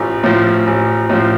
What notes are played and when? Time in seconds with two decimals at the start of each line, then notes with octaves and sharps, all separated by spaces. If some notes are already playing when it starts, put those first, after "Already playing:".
Already playing: A1 A2 F3
0.23 A2 F3
0.67 A1
1.09 A2 F3